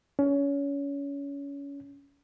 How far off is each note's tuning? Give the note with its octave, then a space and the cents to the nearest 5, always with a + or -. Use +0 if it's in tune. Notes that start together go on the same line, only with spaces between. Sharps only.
C#4 +25